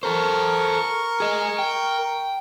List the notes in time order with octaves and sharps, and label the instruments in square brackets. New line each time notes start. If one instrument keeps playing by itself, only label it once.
[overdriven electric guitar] A4 C5 [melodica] A#4 C#6
[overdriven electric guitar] G#4 D#5
G5